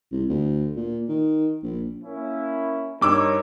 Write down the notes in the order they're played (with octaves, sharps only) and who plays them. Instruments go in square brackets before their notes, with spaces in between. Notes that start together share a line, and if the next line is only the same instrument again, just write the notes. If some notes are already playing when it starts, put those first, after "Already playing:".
[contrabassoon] C2
D2
A#2
D#3
A#1
[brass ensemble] A#3 C#4 E4
[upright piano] G2 D6 E6 [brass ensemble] D#4 A#4 C#5